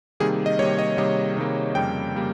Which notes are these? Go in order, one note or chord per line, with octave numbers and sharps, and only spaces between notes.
C3 D#3 G3 A#3 G#4
D#5
C3 D#3 G3 A#3 C#5
D#5
C3 D#3 G3 A#3 D#5
C3 D#3 G3 A#3
F2 C#3 G3 A#3 G5
C#3 G3 A#3